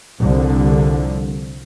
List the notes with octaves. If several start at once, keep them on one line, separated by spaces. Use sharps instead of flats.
C2 D3 F3